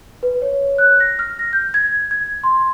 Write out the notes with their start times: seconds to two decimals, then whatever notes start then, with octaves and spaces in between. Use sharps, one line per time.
0.23 B4
0.42 C#5
0.78 F#6
1.00 A#6
1.19 F6
1.39 A#6
1.53 G6
1.74 G#6
2.11 G#6
2.43 C6